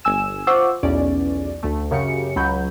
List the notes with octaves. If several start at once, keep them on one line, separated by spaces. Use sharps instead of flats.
G1 G#5 E6 E7
F4 C5 F#5 C#6 D6 E6
B1 E2 C#4 D5
D2 A3
F#2 C#3 G4 C#7
C#2 F#3 B5 G6